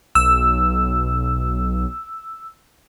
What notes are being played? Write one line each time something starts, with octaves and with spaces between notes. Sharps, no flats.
B1 E6